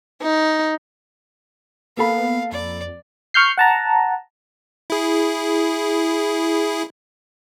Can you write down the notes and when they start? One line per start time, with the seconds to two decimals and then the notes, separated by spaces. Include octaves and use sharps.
0.22 D#4
1.97 A#3 B3 A4 F5 B5
2.52 F2 D5
3.34 C#6 F6 G6 C7
3.58 F#5 A5 A#5
4.90 E4 G#4